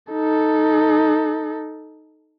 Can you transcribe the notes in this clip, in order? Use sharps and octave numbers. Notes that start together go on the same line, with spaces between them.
D#4 A4